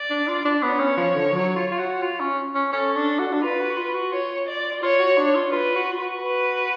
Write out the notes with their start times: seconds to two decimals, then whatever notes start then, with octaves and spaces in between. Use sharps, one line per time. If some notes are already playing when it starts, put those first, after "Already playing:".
Already playing: D5
0.10 D4
0.28 F4
0.45 D4
0.62 B3 C#5
0.80 C#4
0.97 F3
1.15 D3
1.32 F#3
1.56 F4
1.72 F4
1.79 F#4
2.02 F4
2.20 C#4
2.55 C#4
2.73 C#4 A4
2.96 D4
3.19 F#4
3.33 D4
3.43 F4 B4
3.60 F#4
3.70 F#4
3.77 F4
3.95 F#4
4.12 F4 C#5
4.48 D5
4.82 F4 C#5
5.00 F#4
5.18 D4
5.35 F4
5.52 F4 B4
5.75 F#4
5.93 F4
5.99 F#4
6.22 B4